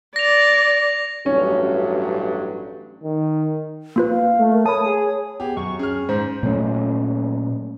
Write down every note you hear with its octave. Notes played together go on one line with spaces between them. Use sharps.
D5 A#6 F7
A1 G2 F#3 C#4
D#3
A#3 F4 B4
F5
A3
A#4
C#5 A5 B5 D#6
G#4
B3 G4 G#4
F#2 C#6
C#4 G#4 F6
G#2 C5
A#2 F#3 A3 C#4